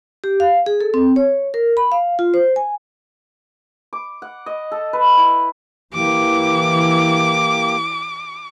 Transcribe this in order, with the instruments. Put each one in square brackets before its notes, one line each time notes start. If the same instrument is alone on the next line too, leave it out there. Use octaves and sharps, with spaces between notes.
[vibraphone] G4
F5
G#4
A4
C4
C#5
A#4
B5
F5
F4
C5
G#5
[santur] D6
F#5
D#5
A4
B4
E4
[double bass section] E3 [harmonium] A#3 G4 [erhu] D6